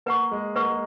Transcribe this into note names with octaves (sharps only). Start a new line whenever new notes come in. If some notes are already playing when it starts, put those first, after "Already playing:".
A#3 B4 F#5 C#6
G#3
A#3 B4 F#5 C#6
G#3